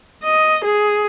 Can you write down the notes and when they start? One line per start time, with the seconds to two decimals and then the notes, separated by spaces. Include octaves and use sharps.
0.24 D#5
0.64 G#4